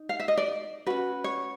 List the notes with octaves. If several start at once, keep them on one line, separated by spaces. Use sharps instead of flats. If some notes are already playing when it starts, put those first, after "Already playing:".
Already playing: D#4
F5
E5
D#5
D5
C#4 F#4 B4
C#5